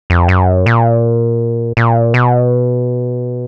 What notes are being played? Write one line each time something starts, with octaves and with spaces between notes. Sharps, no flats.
F2
F#2
A#2
A#2
B2